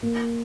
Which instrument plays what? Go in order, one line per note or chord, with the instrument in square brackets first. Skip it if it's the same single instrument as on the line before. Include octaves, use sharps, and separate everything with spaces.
[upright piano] A#3